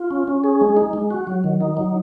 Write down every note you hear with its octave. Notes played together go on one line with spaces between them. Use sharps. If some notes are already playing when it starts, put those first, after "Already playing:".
Already playing: F4
C#4
C#4
G#4
G#3
D#4
G#3
F#4
F#3
D#3
D#4
F#3